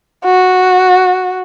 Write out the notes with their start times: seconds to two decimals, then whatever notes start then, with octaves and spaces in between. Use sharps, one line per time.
0.25 F#4